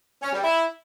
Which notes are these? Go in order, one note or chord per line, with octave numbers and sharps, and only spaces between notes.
C#4
G3
E4